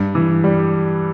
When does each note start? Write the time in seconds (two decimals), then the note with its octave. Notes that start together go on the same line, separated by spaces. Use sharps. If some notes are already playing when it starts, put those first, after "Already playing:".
Already playing: G2
0.15 E3
0.44 G3